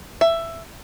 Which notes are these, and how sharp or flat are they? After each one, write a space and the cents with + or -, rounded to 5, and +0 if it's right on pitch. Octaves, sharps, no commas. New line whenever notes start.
E5 +10